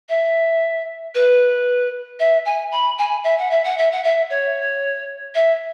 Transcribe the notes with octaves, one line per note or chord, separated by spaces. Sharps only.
E5
B4
E5
G#5
B5
G#5
E5
F#5
E5
F#5
E5
F#5
E5
C#5
E5